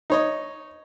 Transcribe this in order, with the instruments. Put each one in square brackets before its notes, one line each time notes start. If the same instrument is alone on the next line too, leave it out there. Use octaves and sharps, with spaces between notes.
[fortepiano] D#4 C#5 D#5